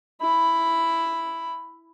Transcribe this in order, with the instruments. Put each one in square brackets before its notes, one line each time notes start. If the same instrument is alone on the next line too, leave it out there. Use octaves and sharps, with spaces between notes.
[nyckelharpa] E4 B5